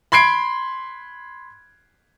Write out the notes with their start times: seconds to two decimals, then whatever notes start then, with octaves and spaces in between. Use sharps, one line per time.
0.12 B5 C6 G#6 C7 D7